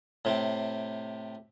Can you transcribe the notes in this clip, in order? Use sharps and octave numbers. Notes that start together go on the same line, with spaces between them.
A2 C3 C4